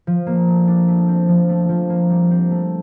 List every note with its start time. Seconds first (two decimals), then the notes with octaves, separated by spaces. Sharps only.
0.07 F3
0.27 A#3
0.48 A3
0.68 D4
0.88 A3
1.08 C4
1.28 F3
1.49 A3
1.69 F3
1.90 A#3
2.10 G3
2.31 C4
2.51 A3